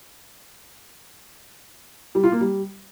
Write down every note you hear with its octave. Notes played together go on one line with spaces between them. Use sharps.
G3
F4
A#3
G3